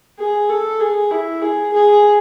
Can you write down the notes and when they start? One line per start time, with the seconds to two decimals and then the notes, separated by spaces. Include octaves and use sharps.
0.19 G#4
0.49 A4
0.81 G#4
1.11 E4
1.41 G#4
1.73 G#4